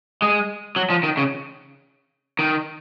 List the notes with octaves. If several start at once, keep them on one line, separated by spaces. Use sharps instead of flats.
G#3
F#3
F3
D#3
C#3
D#3